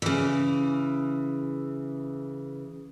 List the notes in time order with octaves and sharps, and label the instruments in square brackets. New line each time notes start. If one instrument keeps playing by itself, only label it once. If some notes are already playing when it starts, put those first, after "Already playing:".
[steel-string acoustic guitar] C#3 E3